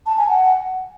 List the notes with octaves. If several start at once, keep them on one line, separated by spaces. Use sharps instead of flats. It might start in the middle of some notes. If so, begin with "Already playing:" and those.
A5
G#5
F#5